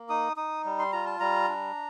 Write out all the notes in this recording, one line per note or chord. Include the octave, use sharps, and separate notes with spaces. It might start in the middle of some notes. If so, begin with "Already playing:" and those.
Already playing: A#3
D#4 D#6
D#4 D#6
G3
C6
F4 A#5
A5
G3 A#5
D4